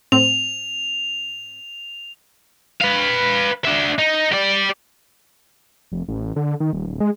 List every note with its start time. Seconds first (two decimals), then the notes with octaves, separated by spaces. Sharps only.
0.12 A2 C4 F7
2.81 B4 F5
3.65 D4 E5
3.99 D#4
4.32 G4 D5
5.92 F1
6.08 A1
6.36 D3
6.60 D#3
6.73 D#1
6.87 D1
7.00 G#3